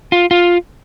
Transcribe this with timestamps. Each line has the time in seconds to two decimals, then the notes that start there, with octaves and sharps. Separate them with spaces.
0.12 F4
0.31 F4